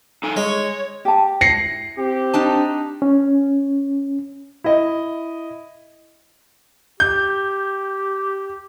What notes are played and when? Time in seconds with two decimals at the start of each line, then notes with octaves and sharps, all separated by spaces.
0.23 D#4 A4 G#5
0.36 G#3 C#5
1.05 G4 A5
1.41 E4 A#6 C7 C#7
1.98 C4 G4
2.34 D4 D#4 A5
3.02 C#4
4.64 E4 D#5
7.00 G4 G6